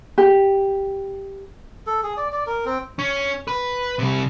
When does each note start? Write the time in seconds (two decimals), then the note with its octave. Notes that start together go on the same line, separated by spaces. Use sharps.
0.18 G4
1.87 A4
2.03 G#4
2.17 D5
2.32 D5
2.47 A#4
2.66 C4
2.99 C#4
3.47 B4
3.99 C3 G3